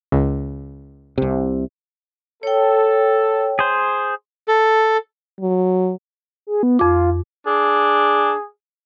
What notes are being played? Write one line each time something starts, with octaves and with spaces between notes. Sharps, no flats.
C#2
C2 C3
A4 C#5 G5
G#4 C5
A4
F#3
G#4
B3
F2 F4 D6
D4 G#4